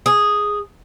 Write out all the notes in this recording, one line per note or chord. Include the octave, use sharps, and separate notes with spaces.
G#4